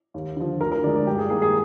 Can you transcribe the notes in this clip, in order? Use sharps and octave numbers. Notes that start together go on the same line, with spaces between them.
D#2
D3 F3
D2 A#4
A#4
D3 F3 G#3 D5
D5
G2 G4
G#4
D#3 A#3 G#4
G#4